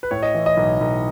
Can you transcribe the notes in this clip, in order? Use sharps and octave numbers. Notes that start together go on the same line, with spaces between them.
B4
A2 C#5
D#5
E3
D#5
B1
B1